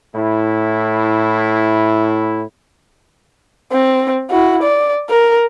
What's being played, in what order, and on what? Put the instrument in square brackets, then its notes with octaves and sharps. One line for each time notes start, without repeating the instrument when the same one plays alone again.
[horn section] A2 E4
[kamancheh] C4
E4 F#4
D5
A#4